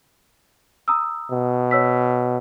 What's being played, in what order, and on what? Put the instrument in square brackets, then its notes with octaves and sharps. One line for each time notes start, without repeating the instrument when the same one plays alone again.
[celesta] A#5 D#6 E6
[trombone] B2
[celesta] C#5 E6 B6